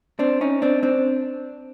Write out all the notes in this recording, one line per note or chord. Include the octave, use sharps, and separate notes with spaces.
C4 D4
C#4 D#4
C4 D4
C4 D4